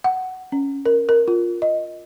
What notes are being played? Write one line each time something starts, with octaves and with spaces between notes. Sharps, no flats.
F#5
C#4
A#4
A#4
F4
D#5